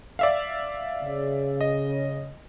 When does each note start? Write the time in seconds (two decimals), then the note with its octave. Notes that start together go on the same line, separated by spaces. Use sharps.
0.19 D5 E5 F5
1.02 C#3
1.61 D#5